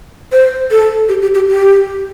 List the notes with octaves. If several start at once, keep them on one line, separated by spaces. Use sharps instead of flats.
C5
A4
G4
G4
G4
G4